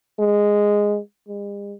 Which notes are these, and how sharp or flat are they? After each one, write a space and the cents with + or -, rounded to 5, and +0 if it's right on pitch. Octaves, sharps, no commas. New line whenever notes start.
G#3 -5
G#3 -45